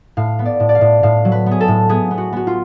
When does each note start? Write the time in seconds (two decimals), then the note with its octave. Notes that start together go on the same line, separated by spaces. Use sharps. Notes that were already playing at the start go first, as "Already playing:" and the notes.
0.17 A2 F5
0.39 B3
0.45 D5
0.60 A2
0.69 D5
0.75 F5
0.81 A2
1.03 A2 F5
1.25 F#3
1.32 B4
1.46 B3 G#4
1.61 A4
1.68 A2
1.89 B3 G#4
2.11 B3
2.18 F#4
2.33 B3 F#4
2.47 F4